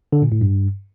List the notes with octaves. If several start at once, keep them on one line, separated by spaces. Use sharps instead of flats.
D3
A#2
A2
G2